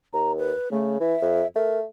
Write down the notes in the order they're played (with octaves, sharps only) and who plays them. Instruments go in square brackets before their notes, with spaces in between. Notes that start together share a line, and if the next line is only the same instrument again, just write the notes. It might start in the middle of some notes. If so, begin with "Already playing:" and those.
[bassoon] D#2 [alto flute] A#5
[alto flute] B4
[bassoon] C#3 [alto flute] A3
[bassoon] E3 [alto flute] E5
[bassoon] F2
[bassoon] A3 [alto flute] A#4